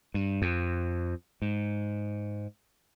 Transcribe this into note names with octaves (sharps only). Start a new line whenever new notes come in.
G2
F2
G#2